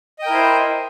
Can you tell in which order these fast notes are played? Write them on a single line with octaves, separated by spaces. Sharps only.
D#5 G5 A#4 E4 C5